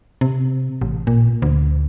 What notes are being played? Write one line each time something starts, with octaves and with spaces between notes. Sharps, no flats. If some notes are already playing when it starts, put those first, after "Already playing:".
C3
A1
A#2
D2